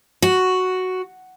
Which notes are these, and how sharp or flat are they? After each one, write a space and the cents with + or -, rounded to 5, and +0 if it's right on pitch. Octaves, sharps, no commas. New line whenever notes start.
F#4 +0